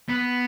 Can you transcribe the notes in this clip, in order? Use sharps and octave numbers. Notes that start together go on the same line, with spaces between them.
B3